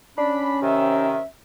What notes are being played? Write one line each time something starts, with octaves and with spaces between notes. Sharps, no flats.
C#4 D4 B5
C3 D#3 E5